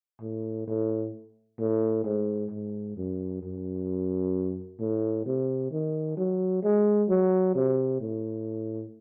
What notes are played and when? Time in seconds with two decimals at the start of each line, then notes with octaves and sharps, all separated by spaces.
0.21 A2
0.67 A2
1.59 A2
2.05 G#2
2.51 G#2
2.97 F#2
3.42 F#2
4.80 A2
5.26 C3
5.71 D#3
6.17 F#3
6.63 G#3
7.09 F#3
7.55 C3
8.01 A2